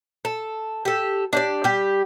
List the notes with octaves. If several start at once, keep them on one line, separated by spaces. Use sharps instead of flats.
A4
G4 A4
D4 G4 D5
G3 G4